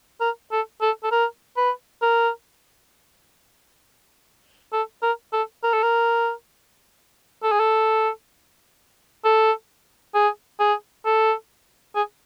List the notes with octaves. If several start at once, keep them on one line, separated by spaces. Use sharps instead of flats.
A#4
A4
A4
A4
A#4
B4
A#4
A4
A#4
A4
A#4
A4
A#4
A4
G#4
A4
A4
G#4
G#4
A4
G#4